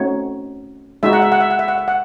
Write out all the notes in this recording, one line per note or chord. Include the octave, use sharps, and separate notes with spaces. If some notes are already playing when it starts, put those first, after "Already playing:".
Already playing: A3 C4 C#4 D#4 F#4 C#5
G#3 D#4 F#4 E5
F#5
E5
F#5
E5
F#5
E5
F#5
E5
F#5